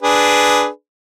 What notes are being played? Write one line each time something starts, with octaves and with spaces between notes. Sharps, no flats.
D4 G#4 B4